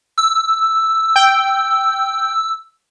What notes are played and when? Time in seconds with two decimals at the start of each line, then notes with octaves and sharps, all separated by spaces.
0.18 E6
1.16 G5